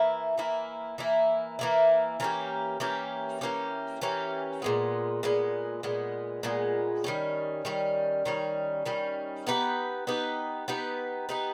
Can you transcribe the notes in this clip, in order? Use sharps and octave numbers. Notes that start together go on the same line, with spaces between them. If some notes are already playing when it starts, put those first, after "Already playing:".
Already playing: E3 A#3 E4
E3 A#3 E4
E3 A#3 E4
E3 A#3 E4
E3 A#3 C#4 G4
E3 A#3 C#4 G4
E3 A#3 C#4 G4
E3 A#3 C#4 G4
A#2 G#3 B3
A#2 G#3 B3
A#2 G#3 B3
A#2 G#3 B3
D#3 G3 C#4
D#3 G3 C#4
D#3 G3 C#4
D#3 G3 C#4
B3 D#4 G4 B4
B3 D#4 G4 B4
B3 D#4 G4 B4
B3 D#4 G4 B4